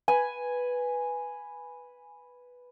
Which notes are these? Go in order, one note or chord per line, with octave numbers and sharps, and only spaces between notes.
B4 G#5